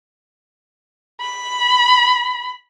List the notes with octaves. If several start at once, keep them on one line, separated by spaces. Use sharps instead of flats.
B5